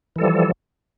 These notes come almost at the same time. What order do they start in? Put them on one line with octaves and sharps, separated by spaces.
E3 A4 G3 F3